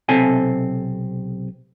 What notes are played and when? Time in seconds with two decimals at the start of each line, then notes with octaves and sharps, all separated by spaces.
0.09 B1 C3 C4 A4 G#5